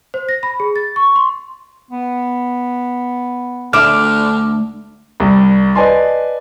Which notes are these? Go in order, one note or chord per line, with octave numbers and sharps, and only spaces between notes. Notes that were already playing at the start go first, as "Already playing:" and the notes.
C5
A#6
B5
G#4
A6
C#6
C6
B3
D2 D3 E5 D6 F6
C2
B4 D5 D#5 G#5 A5 C6